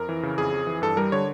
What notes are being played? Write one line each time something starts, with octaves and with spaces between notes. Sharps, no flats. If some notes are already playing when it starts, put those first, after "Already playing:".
Already playing: F2 A#4
E3
C#3
F2 G#4
F2
E3
G2 A4
G3 A#4
D3 C#5